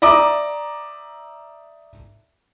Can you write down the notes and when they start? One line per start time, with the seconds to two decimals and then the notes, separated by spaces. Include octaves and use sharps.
0.02 D5 E5 A#5 D6 D#6